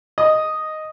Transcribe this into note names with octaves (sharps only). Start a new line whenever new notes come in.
D#5